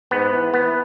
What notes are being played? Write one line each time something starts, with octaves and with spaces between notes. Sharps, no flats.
G#2 B3
E3
E3 B3